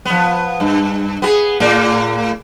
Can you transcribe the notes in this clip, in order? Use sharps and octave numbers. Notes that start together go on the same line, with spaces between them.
F3 B3
G2
B3 F#4 G#4
A2 A#3